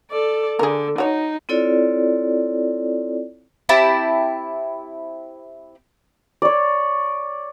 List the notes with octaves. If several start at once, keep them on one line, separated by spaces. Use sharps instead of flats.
A4 D5
D3 G#4 A#4
D#4 F#4 C#5
C4 E4 F4 A4 C#5 D5
C4 E4 G4 A5
C#5 D5